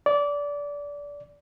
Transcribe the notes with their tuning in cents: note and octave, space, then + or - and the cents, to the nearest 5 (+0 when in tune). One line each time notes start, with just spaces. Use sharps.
D5 -20